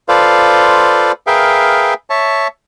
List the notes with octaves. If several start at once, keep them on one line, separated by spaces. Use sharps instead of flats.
F4 A4 B4 C5 D5 F5
G#4 A#4 B4 E5 F5 G5
C#5 E5 A5